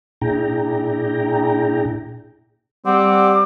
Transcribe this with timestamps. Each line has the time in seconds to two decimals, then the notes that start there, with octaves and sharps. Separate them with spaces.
0.21 A#2 D4 E4 G#4 G5 A#5
2.86 G3 C4 F#5 D6